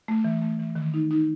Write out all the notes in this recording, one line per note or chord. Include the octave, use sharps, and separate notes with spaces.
A3
E3
A3
E3
D#3
D#4
D#4